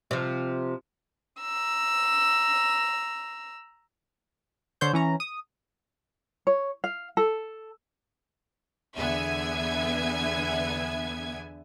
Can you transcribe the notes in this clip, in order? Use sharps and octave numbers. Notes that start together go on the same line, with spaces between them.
C3 F3
A#5 E6
D3 C5 C#5 G6
E3 C#4 A#5
D#6
C#5
F5
A4
E2 D3 B3 E5 G#5 G#6